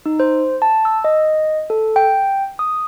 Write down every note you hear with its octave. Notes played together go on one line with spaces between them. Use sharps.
D#4
C5
A5
E6
D#5
A4
G5
D#6